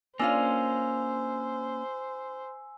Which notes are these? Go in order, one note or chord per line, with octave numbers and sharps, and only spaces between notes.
A#3 C#4 D4 F4 C5 F5 G#5 E6